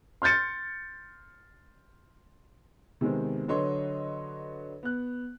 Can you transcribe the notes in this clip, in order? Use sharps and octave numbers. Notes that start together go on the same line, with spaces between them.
C6 F6 G6 A6 C#7
C3 D#3 G#3 B3 C4
D3 F#3 B4 C#5 D#5 C6
B3 F#6